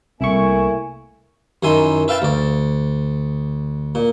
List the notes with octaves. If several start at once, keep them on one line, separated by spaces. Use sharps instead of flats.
C2 A3 A#3 E4 G#5 C#6
F#2 D#3 E4 G#5 C6
B4 E5 F5 G5 A5 B5
D2 D5
A#2